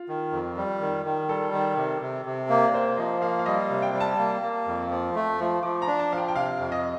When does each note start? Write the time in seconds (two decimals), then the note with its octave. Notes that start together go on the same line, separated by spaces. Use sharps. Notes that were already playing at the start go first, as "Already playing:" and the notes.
Already playing: F4
0.09 D#3
0.33 F2
0.57 G3
0.80 D#3
1.05 D#3
1.29 G3 A4
1.53 D#3
1.77 C3
2.01 C3
2.26 C3
2.50 A#3
2.67 D5
2.74 A#3 C5
2.98 F3 D#5
3.22 A#3 F5
3.39 F5
3.46 G3 D#5
3.70 C3
3.82 G5
3.94 G3
4.00 A5
4.18 A#3
4.43 A#3
4.67 F2
4.91 F3
5.15 A3
5.39 F3
5.63 F3 D6
5.82 A#5
5.87 D4
5.99 A5
6.11 F3 F5
6.17 G5
6.28 G5
6.36 C3 F5
6.60 F2
6.72 D#5